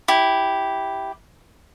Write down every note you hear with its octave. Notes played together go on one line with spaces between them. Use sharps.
E4 G4